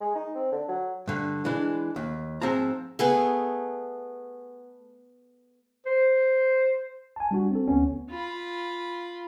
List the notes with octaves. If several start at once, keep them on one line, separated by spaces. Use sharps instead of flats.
G#3
D#4
C4
D3
F#3
G2 D3
E3 G#3 D4
D#2
G#2 F3 C4 G#4 A5 A#5
A3 B3 G#4
C5
G#5 A5
G3 D4 F#4
C4 A4
D2 B3 C#4
F4 B5